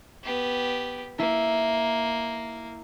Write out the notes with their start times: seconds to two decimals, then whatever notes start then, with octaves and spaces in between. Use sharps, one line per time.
0.24 B3 G4
1.19 A#3 E4